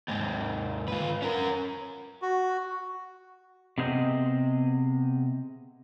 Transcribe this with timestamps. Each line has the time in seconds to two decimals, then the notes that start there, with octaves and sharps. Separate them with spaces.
0.08 D#2 G#2
0.88 F4 B4
1.22 C#4 A#4
2.22 F#4
3.78 C3 B3 G#4 C5 D#5